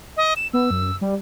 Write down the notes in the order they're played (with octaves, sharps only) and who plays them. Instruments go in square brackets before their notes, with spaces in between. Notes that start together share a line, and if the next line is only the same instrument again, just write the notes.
[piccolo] D#5
E7
[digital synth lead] B3 [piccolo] E6
[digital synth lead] F#2
G3